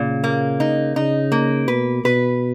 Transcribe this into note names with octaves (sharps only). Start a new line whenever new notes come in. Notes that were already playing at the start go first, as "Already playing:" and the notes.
Already playing: A#2 C#3
A#3
D#4
C#3 D#4
A#3
B2 B4
B2 B4